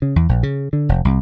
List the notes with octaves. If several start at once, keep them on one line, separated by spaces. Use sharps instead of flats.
C#3
E2
A#1
C#3
D3
F1
C2